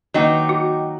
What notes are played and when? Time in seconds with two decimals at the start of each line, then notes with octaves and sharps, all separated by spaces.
0.14 D#3 F#3 A#3 D#4 B4 D#5 G5 D6
0.49 F#4